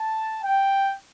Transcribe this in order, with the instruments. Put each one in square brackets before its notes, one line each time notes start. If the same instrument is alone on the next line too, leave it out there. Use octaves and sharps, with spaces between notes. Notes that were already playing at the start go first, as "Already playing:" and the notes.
Already playing: [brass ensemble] A5
G5